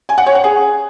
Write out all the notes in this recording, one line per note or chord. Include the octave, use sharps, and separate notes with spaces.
G#5
F#5
C#5
F#5
G#4